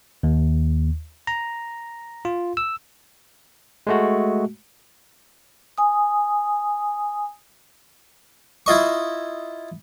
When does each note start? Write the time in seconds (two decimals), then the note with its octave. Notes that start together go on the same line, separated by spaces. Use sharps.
0.23 D#2
1.27 A#5
2.25 F4
2.57 E6
3.87 G#3 A3 F#4
5.78 G#5 D#6
8.66 E4 F4 D#5 C#6